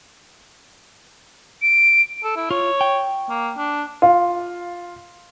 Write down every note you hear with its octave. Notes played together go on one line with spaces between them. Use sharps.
D7
A4
E4
F4 C#5
G5
A#3
D4
F4